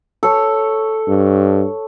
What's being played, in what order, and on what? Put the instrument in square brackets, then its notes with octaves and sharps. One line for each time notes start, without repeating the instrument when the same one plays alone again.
[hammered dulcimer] A4 C#5
[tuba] G2